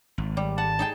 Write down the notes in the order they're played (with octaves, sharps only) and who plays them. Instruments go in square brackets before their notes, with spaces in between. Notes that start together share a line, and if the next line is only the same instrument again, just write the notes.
[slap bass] G#1
[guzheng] G3
[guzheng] F#5 [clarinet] A5
[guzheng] D#4 G#4 G5